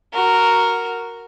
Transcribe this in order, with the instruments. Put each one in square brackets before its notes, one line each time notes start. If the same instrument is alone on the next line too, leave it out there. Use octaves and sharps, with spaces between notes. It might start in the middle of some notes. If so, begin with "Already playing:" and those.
[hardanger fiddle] F#4 A#4